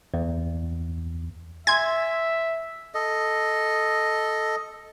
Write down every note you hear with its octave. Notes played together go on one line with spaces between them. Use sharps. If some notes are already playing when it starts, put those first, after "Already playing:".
E2
E5 G#5 C6 G#6
A4 D#5